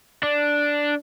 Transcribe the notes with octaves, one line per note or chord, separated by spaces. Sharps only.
D4